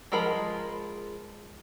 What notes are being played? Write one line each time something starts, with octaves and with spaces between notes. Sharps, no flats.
F3 G#3 A#4 A#5 B5